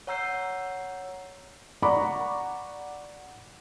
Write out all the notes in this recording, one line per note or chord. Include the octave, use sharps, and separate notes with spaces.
C#5 F#5 A#5 E6 G6 C7
D5 F#5 A#5 B5 C#6 D6